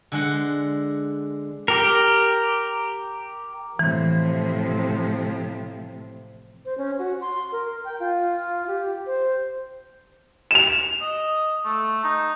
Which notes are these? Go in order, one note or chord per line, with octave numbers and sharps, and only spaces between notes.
D3 G#3 F#5
G4 A#4
A2 C3 E3 F3
C5
C#4
F#4
C6
A#4
G5
F4
G4
C5
E7 F7
D#5
A3
D#4